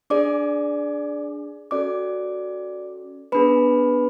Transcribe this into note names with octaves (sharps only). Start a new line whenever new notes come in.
D4 G#4 D5 D6
C#4 F#4 A4 D5 D6
B3 D4 G#4 B4 B5